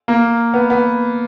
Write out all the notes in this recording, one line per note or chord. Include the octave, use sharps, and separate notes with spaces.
A#3
B3
B3